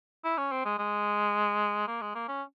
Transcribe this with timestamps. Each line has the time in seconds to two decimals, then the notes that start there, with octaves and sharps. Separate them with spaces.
0.25 E4
0.38 C#4
0.52 C4
0.65 G#3
0.79 G#3
1.88 A#3
2.02 G#3
2.15 A#3
2.28 C#4